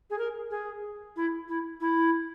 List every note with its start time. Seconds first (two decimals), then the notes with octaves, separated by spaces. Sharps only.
0.10 G#4
0.18 A#4
0.50 G#4
1.16 E4
1.48 E4
1.80 E4